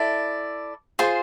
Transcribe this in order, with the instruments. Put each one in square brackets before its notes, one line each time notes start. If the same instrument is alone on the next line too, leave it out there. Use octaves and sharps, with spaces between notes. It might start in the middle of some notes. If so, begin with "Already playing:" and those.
Already playing: [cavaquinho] E4 A4 D5
F4 G#4 C5 C6